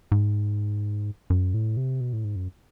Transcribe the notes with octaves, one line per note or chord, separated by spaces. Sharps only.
G#2
F#2
A2
C3
B2
A2
G#2
F#2